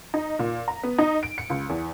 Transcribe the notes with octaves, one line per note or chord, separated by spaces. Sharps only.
D#4
A#2
A#5
B3
D#4
D7
C#7
C#2
E2